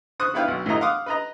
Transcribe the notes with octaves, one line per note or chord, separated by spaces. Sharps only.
C5 C#6 D#6 F#6
B3 D4 E4 B4 F5 G5
B1
A2 E3 A3 D#5 A#5
F5 F#5 C6 D6 D#6
B4 D#5 A#5